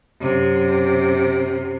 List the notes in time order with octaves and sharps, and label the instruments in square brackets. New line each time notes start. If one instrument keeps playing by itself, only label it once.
[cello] F#2 C3